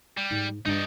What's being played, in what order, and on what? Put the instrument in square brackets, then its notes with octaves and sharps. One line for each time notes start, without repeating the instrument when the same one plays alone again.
[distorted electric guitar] G3
[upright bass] G#2
[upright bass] G2 D4 [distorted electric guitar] D#4 D5